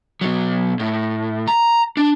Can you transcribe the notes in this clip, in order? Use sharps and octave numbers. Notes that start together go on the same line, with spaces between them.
B2 F#3
A2
A#5
D4